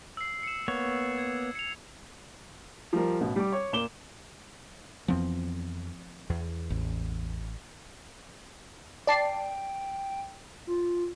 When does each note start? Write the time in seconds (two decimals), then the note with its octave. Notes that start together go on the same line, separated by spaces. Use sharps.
0.17 E6 C7
0.43 C#7 E7
0.68 A#3 B3 C#5
1.18 G#6
1.55 C#7 F7
2.93 F3 G3 A#4
3.21 A1 B2
3.36 G3 D6
3.52 C#5
3.73 A#2 A#4 D6 E7 G7
5.08 F2 E3 F3 B3 C4
6.29 E2
6.70 A1
9.07 D5 G5 A5 C7
10.67 F4